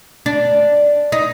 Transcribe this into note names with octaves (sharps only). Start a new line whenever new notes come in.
D4
D#4